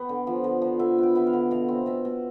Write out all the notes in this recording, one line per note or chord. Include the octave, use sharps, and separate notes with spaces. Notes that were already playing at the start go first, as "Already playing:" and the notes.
Already playing: B3 G5
D3
F3
D3
F3
D3 E5
B3 G5
B3 E5
F5
D3
B2 F5
C4
B2 E5
B2